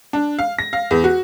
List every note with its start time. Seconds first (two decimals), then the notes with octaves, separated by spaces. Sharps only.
0.13 D4
0.39 F5
0.59 A#6
0.73 F5
0.91 E2
1.04 F#4